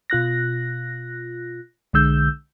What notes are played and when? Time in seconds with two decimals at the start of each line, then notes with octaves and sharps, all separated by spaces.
0.10 B2 F4 F#6 A#6
1.93 B1 D3 G#3 E6 G6